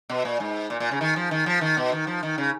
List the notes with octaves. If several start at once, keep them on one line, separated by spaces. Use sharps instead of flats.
B2
A#2
G#2
A#2
A#2
C#3
D#3
F3
D#3
F3
D#3
B2
D#3
F3
D#3
C#3